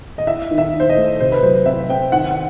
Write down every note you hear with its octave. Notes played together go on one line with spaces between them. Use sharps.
D#5
E4 E5
D#3
E5
D#3
C5
D#5
A3
C3 C5
B4
F#3 C5
C4 E5
C4 G5
D#3 F#5
F#5